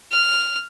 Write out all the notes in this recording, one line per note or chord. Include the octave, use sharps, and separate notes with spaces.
F6